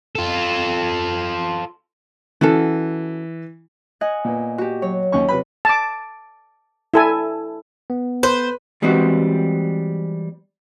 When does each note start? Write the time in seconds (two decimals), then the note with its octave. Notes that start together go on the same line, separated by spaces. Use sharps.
0.15 F4 A4
2.41 E3 C#4 F#4 A4
4.01 D#5 F#5 G#5
4.25 A#2 B3
4.58 F#4 G4
4.82 F#3 C#5
5.12 D#2 C#4 C#6
5.29 C3 B4 B5
5.65 A5 D6
6.94 E4 A4 G#5
7.90 B3
8.23 B4 C5
8.82 E3 G3 G#3 B3 C4 F#4